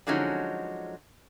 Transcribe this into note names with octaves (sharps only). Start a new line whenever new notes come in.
D3 F3 F#3 G#3 C#4 D#4